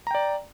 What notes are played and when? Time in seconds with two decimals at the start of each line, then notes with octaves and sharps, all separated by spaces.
0.07 A#5
0.11 G5
0.15 D5